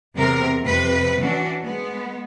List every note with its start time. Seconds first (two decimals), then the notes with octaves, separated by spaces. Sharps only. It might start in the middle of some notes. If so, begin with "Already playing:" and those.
0.16 E2 C3 A#4
0.61 F2 C3 B4
1.19 E3 C#4 D4 F#4
1.63 G#3 B3